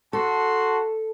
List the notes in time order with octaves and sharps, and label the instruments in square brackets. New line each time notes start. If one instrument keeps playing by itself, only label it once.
[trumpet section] F#4 A5 C6 [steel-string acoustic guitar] A4